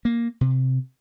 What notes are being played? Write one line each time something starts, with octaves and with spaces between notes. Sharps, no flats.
A#3
C3